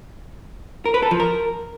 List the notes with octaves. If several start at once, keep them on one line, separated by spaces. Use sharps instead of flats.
A#4
B4
A4
F3
A#4